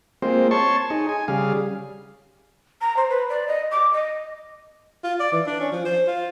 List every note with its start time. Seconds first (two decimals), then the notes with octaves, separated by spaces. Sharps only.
0.22 G#3 A#3 C4 F4 C5
0.51 C#5 A5 C6 C#6
0.90 D#4 G#4
1.09 G#5
1.28 C#3 G3 G#4 F5
2.81 A#5
2.97 C5
3.10 B4
3.29 D5
3.48 D#5
3.71 D6
3.93 D#5
5.04 F4
5.20 D5
5.32 E3
5.47 D4
5.60 C#4
5.72 F3
5.85 C5
6.07 F4